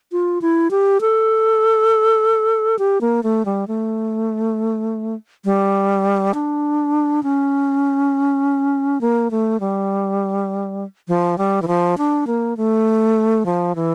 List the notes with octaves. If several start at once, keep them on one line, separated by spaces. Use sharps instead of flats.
F4
E4
G4
A4
G4
A#3
A3
G3
A3
G3
D4
C#4
A#3
A3
G3
F3
G3
E3
F3
D4
A#3
A3
F3
E3